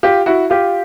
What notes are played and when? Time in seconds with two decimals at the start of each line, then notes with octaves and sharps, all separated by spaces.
0.03 F4 G4
0.26 E4 F#4
0.50 F4 G4